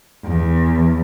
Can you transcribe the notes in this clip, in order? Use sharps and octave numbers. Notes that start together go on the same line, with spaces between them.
E2